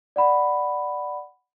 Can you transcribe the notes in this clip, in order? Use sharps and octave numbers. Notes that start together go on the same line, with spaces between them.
D5 F#5 B5